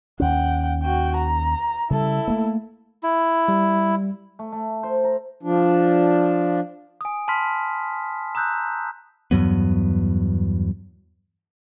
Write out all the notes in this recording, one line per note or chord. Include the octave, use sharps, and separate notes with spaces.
D#2 C#4 F#5 G5
F#4 G5
A#5
C#3 G3 E4 A4
A3 A#3
E4
G3
A3
A3
C5
A#5
F3 D4
G#5 D#6
A5 B5 C6 F6 B6
A#5 D#6 E6 F#6 G6
E2 G2 F#3 B3